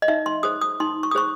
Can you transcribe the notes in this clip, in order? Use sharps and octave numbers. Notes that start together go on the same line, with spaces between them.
D#5
D#4 E5
C6
G#4 C5 D#6
D#6
D#4 C6
C#6
D#6
G#4 C5 C#6